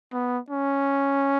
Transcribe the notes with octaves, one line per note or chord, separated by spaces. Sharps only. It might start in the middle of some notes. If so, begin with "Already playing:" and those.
B3
C#4